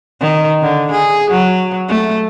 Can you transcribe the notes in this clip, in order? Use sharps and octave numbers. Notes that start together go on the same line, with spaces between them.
D#3
D3
G#4
F#3
A3